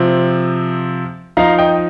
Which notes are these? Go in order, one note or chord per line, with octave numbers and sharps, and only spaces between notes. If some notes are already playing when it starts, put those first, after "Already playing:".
Already playing: C3 F3 C4
F3 D#4 F5 A#5
D#5 G5